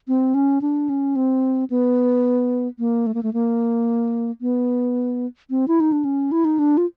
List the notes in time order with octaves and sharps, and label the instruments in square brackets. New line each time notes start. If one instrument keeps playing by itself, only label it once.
[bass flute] C4
C#4
D4
C#4
C4
B3
A#3
A3
A#3
A3
A#3
B3
C4
E4
D#4
D4
C#4
E4
D#4
D4
F4